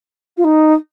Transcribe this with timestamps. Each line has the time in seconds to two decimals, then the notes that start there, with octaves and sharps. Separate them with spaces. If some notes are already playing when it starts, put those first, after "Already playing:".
0.37 F4
0.44 D#4